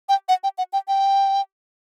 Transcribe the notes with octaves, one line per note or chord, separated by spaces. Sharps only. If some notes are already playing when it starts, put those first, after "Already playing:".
G5
F#5
G5
F#5
G5
G5